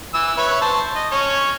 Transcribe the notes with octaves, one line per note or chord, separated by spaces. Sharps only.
E3 E6
B4 C#5 E5
C5 A5 C#6
D#5
C#4 C#5